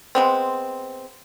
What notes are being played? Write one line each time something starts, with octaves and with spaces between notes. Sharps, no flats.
G#3 B3 C4